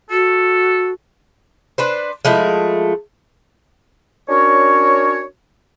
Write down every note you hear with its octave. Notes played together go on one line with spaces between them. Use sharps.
F#4 A4
D4 B4 C5
F3 G#3 A3 E4
C#4 D4 F#4 A#4 C#5